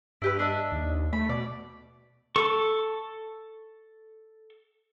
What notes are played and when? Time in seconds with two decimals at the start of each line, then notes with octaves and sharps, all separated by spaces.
0.22 G2 E4 G4 B4
0.39 D4 D#5 E5
0.72 D#2
1.13 A3 B5
1.29 B2 D5
2.36 A4 C#6